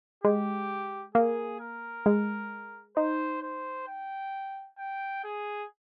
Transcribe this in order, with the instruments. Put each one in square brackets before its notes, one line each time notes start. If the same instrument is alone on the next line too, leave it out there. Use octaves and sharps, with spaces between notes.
[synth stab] G#3 [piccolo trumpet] G4
[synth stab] A#3 [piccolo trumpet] G#4
[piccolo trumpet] A#4
[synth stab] G#3
[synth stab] D#4 [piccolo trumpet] C5
[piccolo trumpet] C5
G5
G5
G#4